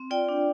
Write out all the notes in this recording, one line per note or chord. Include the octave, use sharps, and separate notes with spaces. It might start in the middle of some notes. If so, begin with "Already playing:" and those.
Already playing: C4
F4 D5 G5
D4